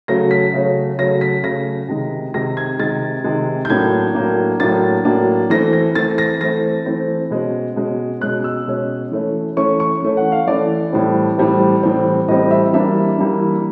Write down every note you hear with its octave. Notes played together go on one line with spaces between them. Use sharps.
C#3 F#3 A3 C#4 A#6
B6
C#3 F#3 A3 C#4
C#3 F#3 A3 C#4 A#6
B6
C#3 F#3 A3 C#4 A#6
C3 D#3 G#3
C3 D#3 G#3 A#6
G#6
C3 D#3 G#3 A6
C3 D#3 G#3
G6
A2 F#3 A#3 D4 G#6
A2 F#3 A#3 D4
A2 F#3 A#3 D4 A6
A2 F#3 A#3 D4
E3 A3 C4 A#6
A#6
E3 A3 C4 A6
A#6
E3 A3 C4 A#6
E3 A3 C4
B2 G#3 C#4
B2 G#3 C#4
B2 G#3 C#4 F#6
E6
B2 G#3 C#4
E3 A3 C#4
E3 A3 C#4 C#6
C#6
E3 A3 C#4
F#5
F5
E3 A3 C#4 D5
A2 E3 G3 C4
A2 E3 G3 C4
A2 E3 G3 C4
A2 E3 G3 C4 D#5
E5
E3 G3 A#3 D4 E5
E3 G3 A#3 D4